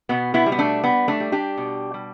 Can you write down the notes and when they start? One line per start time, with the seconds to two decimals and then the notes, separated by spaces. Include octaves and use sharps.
0.09 B2 B3
0.34 B3 E4
0.46 G3
0.52 B3
0.59 A3 D4
0.84 G3 B3
1.08 A3 D4
1.20 G3
1.32 D4 G4
1.57 B2
1.94 G3